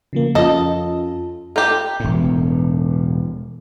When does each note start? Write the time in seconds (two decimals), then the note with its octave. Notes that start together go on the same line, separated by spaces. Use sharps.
0.13 C#3 F3 A#3
0.35 F2 C#4 F4 A4 D#5
1.56 F4 G4 A4 A#5 G6
2.00 E1 A2